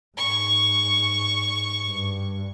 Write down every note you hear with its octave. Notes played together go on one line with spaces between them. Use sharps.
G#2 C#6
G2